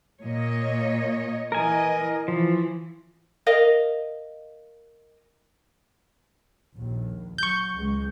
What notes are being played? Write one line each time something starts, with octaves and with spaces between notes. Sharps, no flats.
A#2 C#5 D#5
E3 A#4 D#5 G#5
E3 F3
A#4 D#5 F5
A#1 D#2
F#3 C#6 G6
C#2 G#3